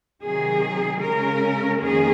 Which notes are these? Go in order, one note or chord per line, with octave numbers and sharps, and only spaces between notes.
C3 D#3 F#3 G#4
C#3 G#3 C#4 A#4
F2 D#3 A#3 C#4 G#4